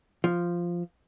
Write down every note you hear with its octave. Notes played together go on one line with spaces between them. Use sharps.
F3